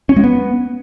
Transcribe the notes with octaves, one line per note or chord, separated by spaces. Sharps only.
C#4
G#3
B3